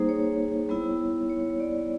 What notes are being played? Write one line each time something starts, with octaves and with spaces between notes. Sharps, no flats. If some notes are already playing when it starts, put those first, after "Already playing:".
Already playing: G3 A#3 D#4 G#4 C5
C#5
G3 B3 E4
C#5
D5